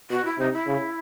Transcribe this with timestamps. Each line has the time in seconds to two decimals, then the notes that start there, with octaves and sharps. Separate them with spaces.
0.10 B2 F#4
0.25 E4
0.38 C3 D#4
0.53 E4
0.67 C#3